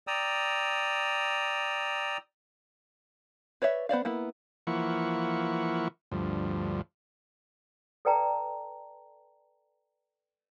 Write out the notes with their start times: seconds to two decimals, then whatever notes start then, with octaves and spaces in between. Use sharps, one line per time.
0.07 D5 G5 A#5 D#6 E6
3.62 B4 C#5 D5 E5
3.89 B3 C5 D5 F5
4.05 A#3 B3 E4
4.67 E3 F3 A#3 E4 F#5 C#6
6.12 D2 G2 F3
8.05 A4 B4 D5 G5 A5 A#5